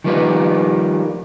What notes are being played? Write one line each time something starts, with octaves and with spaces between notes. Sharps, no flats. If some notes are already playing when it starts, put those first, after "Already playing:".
D#3 F3 G3 A#3 D#4 B4